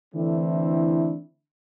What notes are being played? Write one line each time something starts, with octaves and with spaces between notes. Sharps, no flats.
D3 E3 A3 C4 D4 E4